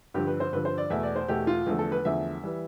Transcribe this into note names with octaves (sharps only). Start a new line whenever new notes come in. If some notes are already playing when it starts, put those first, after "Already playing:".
G2 D3 F3 G4
B4
C5
G2 D3 F3 B4
C5
D5
E2 B2 A3 E5
D5
C5
E2 B2 A3 G4
F4
E2 D3 F3 A3
A4
B4
E2 D3 F3 A3 E5
E3 G3